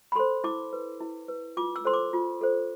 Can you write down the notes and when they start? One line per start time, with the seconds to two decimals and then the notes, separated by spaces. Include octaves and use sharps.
0.12 B5
0.15 A4 C5 C6
0.44 E4 D6
0.73 B4
1.01 E4
1.28 B4
1.57 F4 D6
1.76 E6
1.85 A4 C5 C6
1.93 D6
2.13 F4
2.41 A4 C5